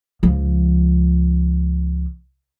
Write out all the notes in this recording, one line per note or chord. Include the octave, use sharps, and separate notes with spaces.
C#2 F3